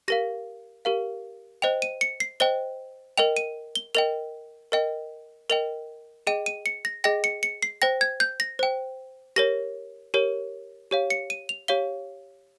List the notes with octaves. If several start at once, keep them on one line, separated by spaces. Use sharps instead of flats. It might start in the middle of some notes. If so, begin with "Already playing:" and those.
G4 A#4 F5 A#6
G4 A#4 F5
C5 D#5 G5 F7
D#7
C#7
C7
C5 D#5 G5 G7
A#4 D#5 G5 F7
D#7
G7
A#4 D#5 G5 F7
A#4 D#5 G5
A#4 D#5 G5 F7
G#4 D#5 G5 D#7
D#7
C#7
A#6
G#4 D#5 G5 A#6
C#7
C#7
C7
C5 G5 A#6
G#6
G6
A#6
C5 G5
G4 A#4 C#5 A#6
G4 A#4 C#5
G4 C#5 F5
C#7
D#7
F7
G4 C#5 F5 G7